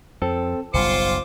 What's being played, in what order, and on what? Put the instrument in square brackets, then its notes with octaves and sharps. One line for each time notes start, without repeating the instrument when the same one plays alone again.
[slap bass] F2 [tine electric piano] C4 A4
[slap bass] F#1 B1 G3 [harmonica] F4 C5 D6 [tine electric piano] C#7